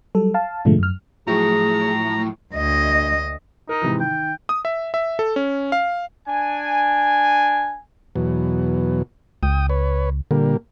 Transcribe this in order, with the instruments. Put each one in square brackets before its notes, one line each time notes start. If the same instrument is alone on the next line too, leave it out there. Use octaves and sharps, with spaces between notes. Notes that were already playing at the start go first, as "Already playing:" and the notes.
[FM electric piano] F#3 G3 A4
F5 A5
G#2 B2 D3 F3 G#3 A3
F#2 F6
[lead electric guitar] A2 [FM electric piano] F3 F#3 E4 [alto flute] G#4 [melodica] A#5
[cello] D2 D#5
[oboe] D#4 [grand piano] A#4
[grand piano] G#2 C3 E3
[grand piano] D#3 [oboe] G5
[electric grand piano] D#6
E5
E5
A4
C#4
F5
[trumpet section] D4 G#5
[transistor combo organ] E2 B2 F#3
[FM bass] C#2 [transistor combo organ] G5 D#6
[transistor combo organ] B4 C#5
[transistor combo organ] A#2 G3 A#3 [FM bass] D3